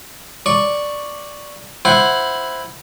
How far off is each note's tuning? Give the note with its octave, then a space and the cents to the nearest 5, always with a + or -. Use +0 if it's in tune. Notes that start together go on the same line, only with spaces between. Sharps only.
D5 +0 C#6 +0
E4 +0 C5 +0 F#5 +0